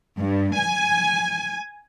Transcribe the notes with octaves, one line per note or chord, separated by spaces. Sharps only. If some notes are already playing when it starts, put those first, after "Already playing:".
G2
G#5